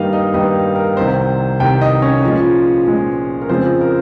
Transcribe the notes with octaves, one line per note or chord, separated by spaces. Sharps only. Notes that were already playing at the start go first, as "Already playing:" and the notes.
Already playing: G2 D#3 G3 A#3 D#4 D#5 F5
D#4 D#5
G2 D#3 G3 A#3 D#4 D#5
A#4
C2 C3 D#3 C5
C2 C3 D#3 G4 G5
D#4 D#5
C#4 C#5
A#2 F3 G#3
A#2 F3 G#3
A#4
F2 C#3 F3 G#3 C4 C5
A#4